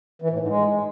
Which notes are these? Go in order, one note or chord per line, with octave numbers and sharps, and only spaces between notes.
E3
A2
G#2
G#3